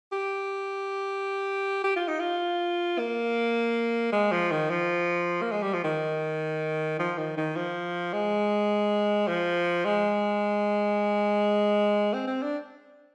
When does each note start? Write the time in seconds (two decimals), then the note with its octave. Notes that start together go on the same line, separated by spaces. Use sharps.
0.12 G4
1.84 G4
1.96 F4
2.08 D#4
2.20 F4
2.99 A#3
4.13 G#3
4.31 F3
4.51 D#3
4.70 F3
5.42 A#3
5.51 G#3
5.62 G3
5.74 F3
5.84 D#3
6.99 F3
7.18 D#3
7.37 D#3
7.56 F3
8.13 G#3
9.28 F3
9.85 G#3
12.14 C4
12.27 C4
12.42 D4